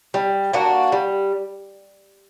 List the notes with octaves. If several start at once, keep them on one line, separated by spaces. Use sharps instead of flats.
G3
A#3 D4 F#4
G3